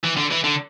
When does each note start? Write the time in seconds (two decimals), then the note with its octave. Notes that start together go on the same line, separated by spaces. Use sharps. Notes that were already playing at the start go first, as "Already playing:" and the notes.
0.04 E3
0.17 D3
0.31 E3
0.44 D3